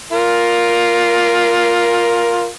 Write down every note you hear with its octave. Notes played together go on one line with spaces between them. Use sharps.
F4 A#4